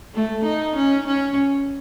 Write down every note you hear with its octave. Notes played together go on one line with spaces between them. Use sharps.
A3
D#4
C#4
C#4